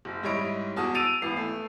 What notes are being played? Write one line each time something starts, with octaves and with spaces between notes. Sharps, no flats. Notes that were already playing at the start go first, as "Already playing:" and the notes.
F#1
G#2 G3 E4 C#5 D#5 D7
E2 F#4 G#4 A5 D#6
E6 A6 D7 D#7 F7
G#1 E3 B3 C7
A3